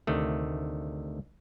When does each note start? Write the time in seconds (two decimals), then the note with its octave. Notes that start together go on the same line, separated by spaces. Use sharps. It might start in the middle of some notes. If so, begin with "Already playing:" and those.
0.07 D2 C3 D#3 A3